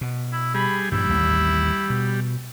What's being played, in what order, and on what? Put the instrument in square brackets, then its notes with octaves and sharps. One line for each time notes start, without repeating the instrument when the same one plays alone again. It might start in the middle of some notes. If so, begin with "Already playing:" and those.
[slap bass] B2
[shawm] E4
[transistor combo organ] G3 G#4 [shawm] B5
[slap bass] G2 A#2 F3 [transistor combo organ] G3 [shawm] E4
[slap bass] A1 D#2
B2